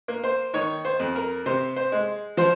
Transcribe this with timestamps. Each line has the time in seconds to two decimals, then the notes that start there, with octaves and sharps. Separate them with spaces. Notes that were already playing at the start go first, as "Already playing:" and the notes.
0.08 A#3
0.24 C5
0.54 D#3 C#5
0.85 C5
0.99 F2
1.16 A#4
1.46 C3 C5
1.76 C5
1.92 G#3
2.37 F3 C5